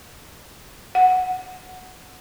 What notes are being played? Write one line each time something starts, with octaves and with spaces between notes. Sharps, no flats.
F#5